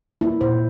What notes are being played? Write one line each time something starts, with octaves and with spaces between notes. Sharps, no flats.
A#3 E4
A#2 C5